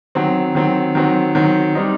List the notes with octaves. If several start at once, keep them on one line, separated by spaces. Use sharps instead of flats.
D#3 F#3 C4
D#3 F#3 C4
D#3 F#3 C4
D#3 F#3 C4
G3 C4 D#4